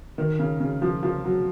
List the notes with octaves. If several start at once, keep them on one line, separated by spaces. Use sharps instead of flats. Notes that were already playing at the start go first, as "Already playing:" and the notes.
D#3
C#3
C#3
F3
F3
F#3